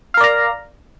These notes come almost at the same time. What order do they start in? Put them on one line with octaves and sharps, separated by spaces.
F5 A#4 D5 A#5